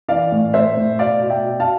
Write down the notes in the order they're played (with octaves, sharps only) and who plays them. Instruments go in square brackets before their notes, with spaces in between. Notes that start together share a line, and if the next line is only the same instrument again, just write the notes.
[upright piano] E3 D5 F5
A2
A2 C5 E5
A2
B2 D5 F5
B2
E5 G5
B2
F5 A5